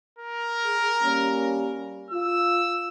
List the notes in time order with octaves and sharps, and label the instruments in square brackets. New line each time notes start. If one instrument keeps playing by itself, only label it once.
[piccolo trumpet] A#4
[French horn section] G#4
G3 A#3 C#4
[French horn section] F4 [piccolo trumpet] E6